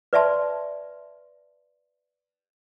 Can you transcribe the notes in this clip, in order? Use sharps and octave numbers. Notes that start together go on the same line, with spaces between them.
B4 D5 E5 A5 C6